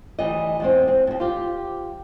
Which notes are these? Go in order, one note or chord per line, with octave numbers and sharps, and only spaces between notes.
D2 E3 G3 D#5
E2 G#3 C4
C4
D#2 G#2
F4 G4